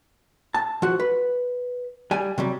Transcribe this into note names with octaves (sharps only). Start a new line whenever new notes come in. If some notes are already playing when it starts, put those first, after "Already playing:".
A5
F3 F#4
B4
G3 G#5
C3 F#3 G3